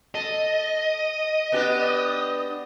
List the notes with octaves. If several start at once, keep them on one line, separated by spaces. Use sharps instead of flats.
A4 D#5
B3 D4 G4